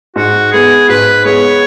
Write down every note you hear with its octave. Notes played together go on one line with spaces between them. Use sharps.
G#2 F#4
G#3 B3 G#4
G#2 B4
G#3 B3 C#5